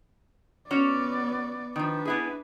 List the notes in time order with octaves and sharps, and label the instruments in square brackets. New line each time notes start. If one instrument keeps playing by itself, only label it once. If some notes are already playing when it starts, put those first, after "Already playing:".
[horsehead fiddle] B3 D5 [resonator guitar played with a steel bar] C#4 F#4 C#5
[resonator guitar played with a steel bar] D#3 F3 [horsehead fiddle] D4 B4
[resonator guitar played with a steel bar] B3 E4 G#4